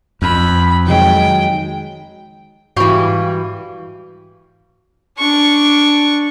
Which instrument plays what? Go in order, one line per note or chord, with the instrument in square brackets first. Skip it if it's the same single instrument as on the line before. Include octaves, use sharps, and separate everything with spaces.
[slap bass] F2 [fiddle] B5
[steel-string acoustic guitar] D#3 F#3 G#3 [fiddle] G5
[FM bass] G#2 [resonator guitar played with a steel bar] E3 G3 [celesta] F#4 [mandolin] F5 G5 C#6
[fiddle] D4 C#6